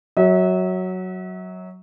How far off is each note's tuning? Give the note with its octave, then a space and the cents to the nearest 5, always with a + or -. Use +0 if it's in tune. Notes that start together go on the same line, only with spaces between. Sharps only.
F#3 +0 E5 -40